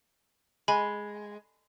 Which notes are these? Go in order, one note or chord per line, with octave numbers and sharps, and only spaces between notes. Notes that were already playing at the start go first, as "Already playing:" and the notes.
G#3 G#5 B5